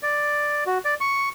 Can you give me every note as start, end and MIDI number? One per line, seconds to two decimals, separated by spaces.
0.03 0.64 74
0.66 0.78 66
0.85 0.95 74
1.01 1.29 85